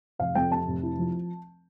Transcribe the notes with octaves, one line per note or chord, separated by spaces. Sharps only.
F1 F5
F2 G5
C3 A5
F1
E4
F3